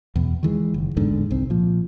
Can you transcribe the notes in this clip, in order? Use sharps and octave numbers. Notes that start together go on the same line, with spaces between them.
E2 B2
D#3 E3 G#3
F#1
A1 E2 G#2 D3
C2 C4
A#2 F3